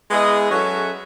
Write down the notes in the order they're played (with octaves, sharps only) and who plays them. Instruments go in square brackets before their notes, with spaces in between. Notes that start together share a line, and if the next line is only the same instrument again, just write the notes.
[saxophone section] G#3 B3 E4 G#4 D#5
F#3 C#4 F#4 A4 E5